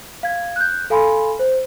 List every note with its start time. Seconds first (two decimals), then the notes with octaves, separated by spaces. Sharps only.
0.23 F5 G#6
0.56 F#6 G6
0.90 A4 F5 G#5 B5 C6
1.39 C5